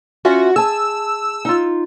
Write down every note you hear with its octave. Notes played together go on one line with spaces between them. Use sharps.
C#4 F4 F#4 E5
G#4 A5 E6
D#4 F4